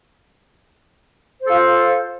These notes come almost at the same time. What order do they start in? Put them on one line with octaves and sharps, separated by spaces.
C5 A4 F4